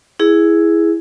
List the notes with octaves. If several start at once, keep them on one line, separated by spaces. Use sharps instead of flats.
E4 G#4